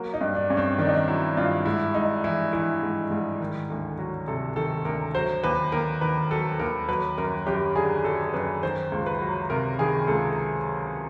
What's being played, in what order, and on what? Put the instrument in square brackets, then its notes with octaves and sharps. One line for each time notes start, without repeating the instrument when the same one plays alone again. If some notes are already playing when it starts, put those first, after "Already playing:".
Already playing: [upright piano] F#3 A#3
D#4
G2
D4
G2 C#4
C4
D#3 D4
D#4
D4
F#3 E4
G2 F4
G#2 E4
G#2 D#4
E3 E4
E3 E4
G#2
G#2
D#3
D2
F#3
C3 A4
D#3 A4
D2 A#4
F#3 C5
D#2 B4
D#2 A#4
D#3 B4
F#3 A4
D#2 A#4
F#3 B4
F#2 A#4
F#2 G4
D3 G#4
F#3 A4
F#2 B4
D#3 C5
C#2
B4
F#3
C3 A#4
D#3 G#4
C#2 A4